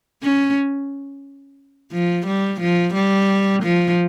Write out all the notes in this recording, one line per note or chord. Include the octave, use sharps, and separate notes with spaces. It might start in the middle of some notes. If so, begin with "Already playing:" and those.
C#4
F3
G3
F3
G3
F3